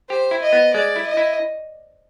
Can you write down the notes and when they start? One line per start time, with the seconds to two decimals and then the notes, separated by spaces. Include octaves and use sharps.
0.09 G4 C5
0.31 E4
0.42 D#5
0.53 B3
0.74 G#3 D5
0.96 E4
1.07 D#5
1.17 E4